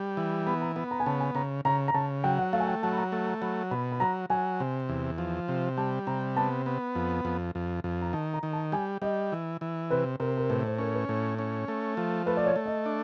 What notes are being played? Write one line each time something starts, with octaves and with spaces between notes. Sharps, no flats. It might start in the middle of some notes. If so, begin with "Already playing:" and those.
Already playing: G3
E3
B3 B5
A#5
B3 B5
A#5
G#5
C#3 A5
G#5
C#3 A#5
C#3 A#5
A#5
C#3 A5
F#3 G5
F#5
A3 F5
G#5
G5
F#3 A5
B5
A#5
A3 A5
A#5
F#3 B5
B2 B5
B5
F#3 A#5
F#3 G#5
C3
E2
F3
C3
G3 A5
C3 A#5
B3 A5
B3
F2
F2
F2
F2
A#5
D#3 A5
A#5
D#3
A5
G3 G#5
G3 D#5
E3
E3
C3 B4
C3 A#4
A#4
A2 B4
C5
C#4 A#4
B4
A2
C#4
A3
F3
A3 B4
D5
C#5
A3
D#5
D4